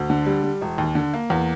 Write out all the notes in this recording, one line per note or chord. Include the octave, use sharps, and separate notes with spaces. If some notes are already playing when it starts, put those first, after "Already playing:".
Already playing: D2
D3
G3
G3
E1
D#2
D3
A#3
E2